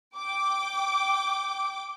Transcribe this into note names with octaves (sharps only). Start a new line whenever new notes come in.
G5 D6